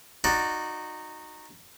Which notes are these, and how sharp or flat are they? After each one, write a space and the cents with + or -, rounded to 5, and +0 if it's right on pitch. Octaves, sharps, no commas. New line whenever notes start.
D#4 -15 F#4 -15 D5 +0